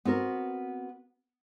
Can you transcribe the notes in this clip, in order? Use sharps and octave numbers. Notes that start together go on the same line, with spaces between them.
B3 C4 F#4 A#4